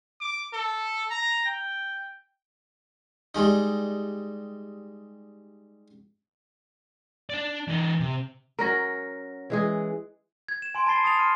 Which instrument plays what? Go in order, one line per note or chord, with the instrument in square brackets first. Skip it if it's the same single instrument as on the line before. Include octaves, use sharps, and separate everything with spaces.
[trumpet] D6
A4
A#5
G5
[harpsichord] G3 G#3 D#4
[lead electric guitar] D4 D5
E3 D#4
C3
[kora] F#3 C#4 A#4 [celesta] A#5 A#6
[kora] E3 G#3 G#4
[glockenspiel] G#6
E7
G#5 C6 D7 E7
A5 B5 A6 C7 G7
D#6 A6 C#7 F7
C6 F6 D#7